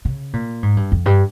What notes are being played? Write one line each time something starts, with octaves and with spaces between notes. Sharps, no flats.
C#3
A#2
G#2
G2
F2
G2